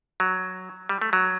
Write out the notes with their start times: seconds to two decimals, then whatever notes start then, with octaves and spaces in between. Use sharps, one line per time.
0.20 F#3
0.89 G3
1.01 A3
1.13 F#3